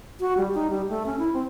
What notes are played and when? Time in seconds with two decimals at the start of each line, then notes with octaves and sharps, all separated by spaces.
0.20 F#4
0.37 G3
0.55 D#4
0.70 G3
0.89 A3
1.06 C#4
1.19 E4
1.33 C4